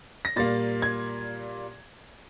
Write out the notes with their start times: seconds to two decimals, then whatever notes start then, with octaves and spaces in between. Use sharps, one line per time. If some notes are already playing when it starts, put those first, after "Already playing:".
0.25 A#6
0.36 A#2 G3 A#3 A6
0.82 G#6